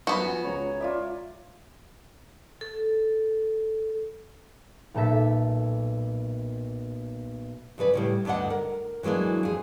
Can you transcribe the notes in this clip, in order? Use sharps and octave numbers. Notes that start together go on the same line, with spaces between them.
F#2 B3 F#4
F3 G#5
C#2 C#5 A#5
F4 D5 E5
A4
B1 A#2 A4 E5 B6
F2 C#3 B4 D5
A2 C#3 G3
D2 G2 D4 D#5 F#5
A#4
E3 F#3 G#3 A#3 D4
F2 G#4